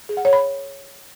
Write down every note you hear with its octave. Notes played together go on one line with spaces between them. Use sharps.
G#4
F#5
C#5
B5